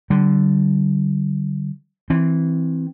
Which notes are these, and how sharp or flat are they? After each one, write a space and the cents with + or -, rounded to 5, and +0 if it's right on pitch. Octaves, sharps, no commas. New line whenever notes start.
D3 +0 G3 -40
E3 -5 C4 +0